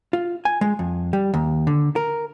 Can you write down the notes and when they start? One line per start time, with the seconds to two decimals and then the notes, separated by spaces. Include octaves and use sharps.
0.13 F4
0.45 G#5
0.61 G#3
0.79 F2
1.13 G3
1.34 D#2
1.67 D3
1.96 A#4